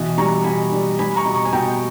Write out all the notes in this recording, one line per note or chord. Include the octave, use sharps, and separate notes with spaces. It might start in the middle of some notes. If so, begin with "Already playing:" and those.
Already playing: B2 E3
G3 A#5 C#6
B2 G#5 B5
G3
G3 G#5 B5
A#5 C#6
B2
A#5 C#6
G#5
B2 G5 A#5